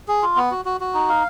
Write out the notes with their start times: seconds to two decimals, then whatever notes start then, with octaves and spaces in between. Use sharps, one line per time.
0.08 G#4
0.23 F4
0.36 B3
0.51 F#4
0.65 F#4
0.81 F#4
0.94 D#4
1.09 F5